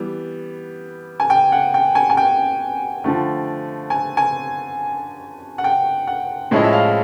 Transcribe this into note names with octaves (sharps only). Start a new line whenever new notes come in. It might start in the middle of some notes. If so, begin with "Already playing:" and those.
Already playing: E3 G3 B3
G#5
G5
F#5
G5
G#5
G#5
G5
D3 F3 A3
G#5
G#5
F#5
G5
F#5
A2 F3 G#3 C#4 E4 D#5
E5
F5